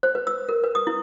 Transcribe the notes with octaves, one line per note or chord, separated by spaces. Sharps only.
C5
B4
E6
A#4
B4
D#6
E4